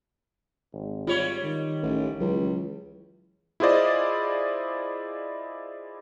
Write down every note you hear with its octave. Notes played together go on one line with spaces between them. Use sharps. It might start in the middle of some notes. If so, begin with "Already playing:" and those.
G#1
G3 F4 C#5
D#3
A1
C#2 E3 F#3
E4 F4 G#4 C5 D5 D#5